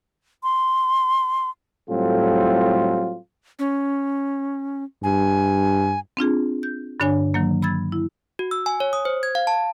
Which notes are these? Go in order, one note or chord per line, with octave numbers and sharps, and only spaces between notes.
C6
A2 F#3 G3 C4 F4 A4
C#4
G2 G#5
C4 D4 F4 G#4
G6
G2 D3 D4 C#5 G#5
D#3 F#3 A#3
B5 E6 G#6 A6
E4
F#4
E6
G#5
C#5
D#6
C5
G#6
F5
A5